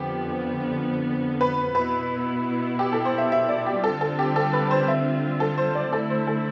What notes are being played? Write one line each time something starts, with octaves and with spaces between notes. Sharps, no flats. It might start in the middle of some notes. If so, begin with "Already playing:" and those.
Already playing: F2 D3 F3 B3 G4
B4
B2 B3 E4 B4
G4
A4
C5
E5
E5
D5
G4
D3 G3 C4 F4 A4
A4
G4
A4
B4
C5
E5
A4
C5
D5
D3 A3 E4 A4
C5
A4